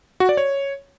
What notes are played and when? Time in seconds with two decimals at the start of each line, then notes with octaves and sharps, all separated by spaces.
0.20 F#4
0.29 D5
0.37 C#5